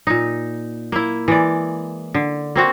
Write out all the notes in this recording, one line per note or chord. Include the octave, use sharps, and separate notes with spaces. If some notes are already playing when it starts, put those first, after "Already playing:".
A#2 D#4
A#3 E4
E3 G#3 D5
D3
A#3 C4 F#4